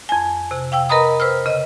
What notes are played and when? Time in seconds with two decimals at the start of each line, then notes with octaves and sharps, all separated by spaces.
0.09 F2 G#5
0.51 C3
0.72 F5 G5 E6
0.89 A#4 B4 D#5 A#5 B5 D#6
1.20 B4 C5 E6 F6
1.46 C#3 D#5